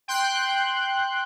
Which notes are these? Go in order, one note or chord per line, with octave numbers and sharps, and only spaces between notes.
G5 C6 F#6 G6